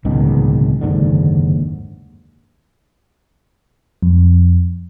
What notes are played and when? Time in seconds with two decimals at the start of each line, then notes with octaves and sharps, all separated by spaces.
0.05 D1 C#2 B2 D#3
0.81 F#1 D#2 G#2 D3
4.02 F2